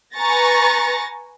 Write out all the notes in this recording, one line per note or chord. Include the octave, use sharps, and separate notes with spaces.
B4 G#5 A#5 C#6 A6 A#6